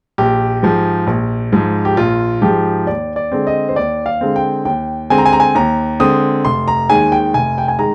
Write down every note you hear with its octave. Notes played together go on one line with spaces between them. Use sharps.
A#1 G4
G#2 F3 G#3
A#1
G#2 F3 G#3
G4
A#1 F4
G#2 F3 G#3 G4
D#2 D5
D5
D3 G#3 C4
D#5
C5
D#2 D5
F5
D3 G#3 C4
G5
D#2 G5
D3 G#3 C4 G#5
A#5
G#5
A#5
G#5
D#2 A#5
D3 G#3 C4 D#6
F1 C6
A#5
D#2 D#3 G#3 G#5
G5
F1 G#5
G5
G#5
D#3 G#3 A#5